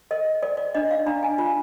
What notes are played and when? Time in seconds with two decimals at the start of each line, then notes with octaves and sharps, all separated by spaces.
0.11 A#4 D#5
0.42 A#4 D5
0.57 D5
0.75 D4 D#5
0.91 F5
1.06 D4 A#5
1.23 G#5
1.38 F4